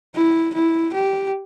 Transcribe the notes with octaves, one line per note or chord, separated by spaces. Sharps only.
E4
E4
G4